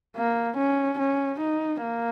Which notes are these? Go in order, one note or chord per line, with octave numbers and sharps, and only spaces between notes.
A#3
C#4
C#4
D#4
A#3